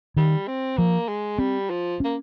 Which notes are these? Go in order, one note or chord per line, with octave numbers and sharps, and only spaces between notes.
D#3 G3
C4
F3 A#3
G#3
G3 C4
F3
A#3 C#4